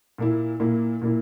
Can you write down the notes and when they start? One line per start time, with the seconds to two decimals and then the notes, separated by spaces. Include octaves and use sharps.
0.18 A#2 A#3 E4
0.60 A#2 A#3 E4
1.02 A#2 A#3 E4